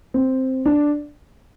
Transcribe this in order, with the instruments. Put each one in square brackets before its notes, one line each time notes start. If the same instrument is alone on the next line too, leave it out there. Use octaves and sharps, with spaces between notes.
[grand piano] C4
D4